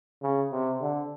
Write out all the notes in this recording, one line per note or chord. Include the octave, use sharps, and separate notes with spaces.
C#3
C3
D3